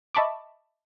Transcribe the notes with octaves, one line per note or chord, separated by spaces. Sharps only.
D#5 E5 A5 B5 C#6 D6